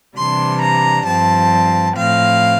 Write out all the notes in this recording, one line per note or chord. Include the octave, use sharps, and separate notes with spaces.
C3 E3 G3 D4 C6
A#5
G2 F3 C4 A5
A2 F3 C4 F5